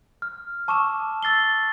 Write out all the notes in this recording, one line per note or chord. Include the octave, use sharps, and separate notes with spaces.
F6
A5 C#6 D6 E6 E7
E6 A6 C7 G7